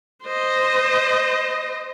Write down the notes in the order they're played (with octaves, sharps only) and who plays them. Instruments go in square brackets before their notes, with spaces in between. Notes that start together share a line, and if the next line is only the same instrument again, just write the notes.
[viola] C5 D#5